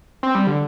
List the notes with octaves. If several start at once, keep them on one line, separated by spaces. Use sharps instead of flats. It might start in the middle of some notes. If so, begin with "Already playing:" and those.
C4
G3
D3